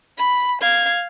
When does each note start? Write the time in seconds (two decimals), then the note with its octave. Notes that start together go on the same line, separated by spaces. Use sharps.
0.18 B5
0.61 F5 G#6